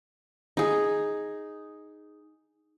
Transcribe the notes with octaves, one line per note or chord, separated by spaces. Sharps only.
D#4 G#4